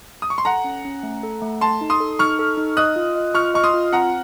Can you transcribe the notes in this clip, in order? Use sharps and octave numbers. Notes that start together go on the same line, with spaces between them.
D#6
C#6
C6
A4 F#5 A#5
C#4
C#4
A3
A4
A3
A4 A5 C6
D#4
C6 D#6
A4
D#4 C#6 F6
A4
D#4
D#5 D#6 F#6
F4
D#5
F4 C#6 F6
D#5 C#6
C6 D#6
F4
C4 F#5 A#5